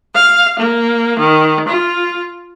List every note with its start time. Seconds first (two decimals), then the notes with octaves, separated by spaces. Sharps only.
0.13 F5
0.57 A#3
1.18 D#3
1.68 F4